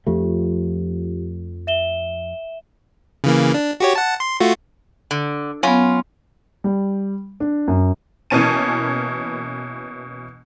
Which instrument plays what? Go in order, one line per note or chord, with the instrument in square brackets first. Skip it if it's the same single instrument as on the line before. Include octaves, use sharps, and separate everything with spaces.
[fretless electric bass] F2 F3 A3 [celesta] F4 G4
[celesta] E5 E7 G7
[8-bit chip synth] C#3 E3 A#3
D4
F#4 G4 C#5
F#5 A5
C6
A3 F4 F#4
[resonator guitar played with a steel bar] D3
[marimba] F#3 B3 [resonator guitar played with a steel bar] C#4 F4
[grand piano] G3
D4
F#2
[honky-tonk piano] B2 E3 A#3 C#4 A5 D#7